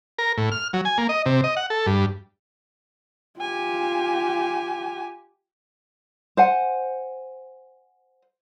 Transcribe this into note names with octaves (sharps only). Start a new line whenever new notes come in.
A#4
A2
F6
F#3
G#5
A#3
D#5
C3
D#5
F#5
A4
G2
F4 G4 G#5
C5 F#5 G#5